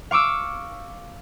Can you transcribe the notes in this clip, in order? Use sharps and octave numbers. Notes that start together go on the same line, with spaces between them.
F5 C#6 D6 E6